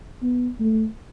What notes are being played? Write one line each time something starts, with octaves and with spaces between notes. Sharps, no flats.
B3
A3